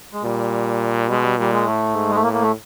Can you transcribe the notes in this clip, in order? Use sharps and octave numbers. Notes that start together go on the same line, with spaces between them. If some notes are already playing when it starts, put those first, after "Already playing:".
G#3
A#2 G3
B2 G#3
G3
A#2 G3
G#3
A2 A3
G#2
G#3
A3
A2 A#3
A#3
A3